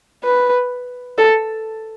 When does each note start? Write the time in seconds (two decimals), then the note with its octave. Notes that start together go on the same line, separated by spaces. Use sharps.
0.24 B4
1.18 A4